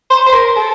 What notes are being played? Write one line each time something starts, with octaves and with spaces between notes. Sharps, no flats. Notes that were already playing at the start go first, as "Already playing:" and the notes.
C5
C5
A#4
A4